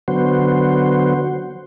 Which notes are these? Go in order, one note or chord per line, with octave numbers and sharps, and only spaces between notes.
D3 F#3 B3 F#4 C5